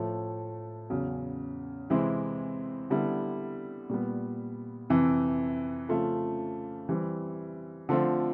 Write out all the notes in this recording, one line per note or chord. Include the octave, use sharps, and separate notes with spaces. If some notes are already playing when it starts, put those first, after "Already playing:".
Already playing: A2 F3 A3
E2 C#3 F#3
C3 E3 G#3 C4 E4
D3 G3 B3 E4
A#2 G3 B3
F2 C3 E3
C#3 F3 A3 C4 F4
E3 G3 C4
D3 F3 A3 C4 F4